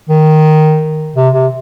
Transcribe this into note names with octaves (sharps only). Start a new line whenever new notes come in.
D#3
C3
C3